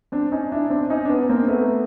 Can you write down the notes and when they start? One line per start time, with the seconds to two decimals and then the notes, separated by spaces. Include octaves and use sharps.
0.12 C4 D4
0.32 C#4 D#4
0.52 D4 E4
0.70 C4 D4
0.90 C#4 D#4
1.05 D4
1.09 B3 C#4
1.29 A#3 C4
1.48 A3 B3